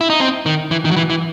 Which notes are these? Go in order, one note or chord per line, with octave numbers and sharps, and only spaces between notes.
E4
D#4
C4
D#3
E3
D#3
F#3
E3
E3